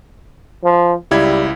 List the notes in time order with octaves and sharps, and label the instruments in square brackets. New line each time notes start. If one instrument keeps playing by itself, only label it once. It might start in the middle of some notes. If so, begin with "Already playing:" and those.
[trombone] F3
[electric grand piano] C#2 E4 G#6 [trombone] G3